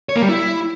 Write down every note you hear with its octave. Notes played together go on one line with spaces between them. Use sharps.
C#5
A#3
G3
E4